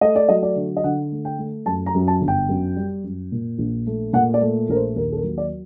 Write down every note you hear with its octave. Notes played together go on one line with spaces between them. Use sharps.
A3 D#5
D5
F#3 D#5
D5
D3
D#5
D3 F#5
A3
G5
A3
F#2 A5
A#5
F#2
A5
G1
G5
F#2
G3
F#2
A#2
A#1
A3
A#2 F#5
D5
A3
A#1 A#4
C5
D#2 A#4
A4
A#4
F#3
D5